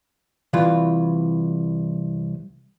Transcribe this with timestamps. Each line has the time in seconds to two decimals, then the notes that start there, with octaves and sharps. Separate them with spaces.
0.53 C2 E3 F4